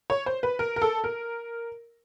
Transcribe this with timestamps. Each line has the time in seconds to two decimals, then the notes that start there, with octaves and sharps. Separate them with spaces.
0.10 C#5
0.26 C5
0.43 B4
0.59 A#4
0.76 A#4
0.82 A4
1.04 A#4